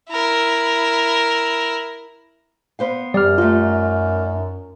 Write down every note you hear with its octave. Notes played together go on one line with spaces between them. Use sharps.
E4 A#4
B3 C5 F5
F#2 G3 D5 F6
A3 D#4 F4